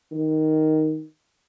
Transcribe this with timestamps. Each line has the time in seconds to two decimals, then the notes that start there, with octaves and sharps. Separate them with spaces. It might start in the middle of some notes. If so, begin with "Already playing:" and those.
0.12 D#3